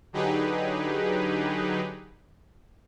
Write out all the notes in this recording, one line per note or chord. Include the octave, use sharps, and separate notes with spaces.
D3 F#3 D#4 G4 G#4 B4